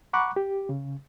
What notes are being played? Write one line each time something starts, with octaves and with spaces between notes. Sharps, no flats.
F#5 A#5 B5 C#6 D6 F#6
G4
C#3